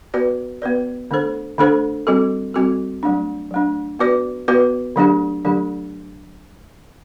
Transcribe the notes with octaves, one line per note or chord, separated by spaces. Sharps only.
B3 F#4 B4 D5
B3 F#4 B4 D5
D3 A3 D4 A4 C5
D3 A3 D4 A4 C5
G3 C4 F#4 A4
G3 C4 F#4 A4
F#3 A3 D4
F#3 A3 D4
B3 F#4 B4 D5
B3 F#4 B4 D5
D3 F#3 A3 D4 G4
D3 F#3 A3 D4 G4